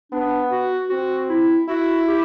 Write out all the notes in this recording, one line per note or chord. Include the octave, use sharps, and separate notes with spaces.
B3 D4
F#4
C4 F#4
E4
E4 F#4
G4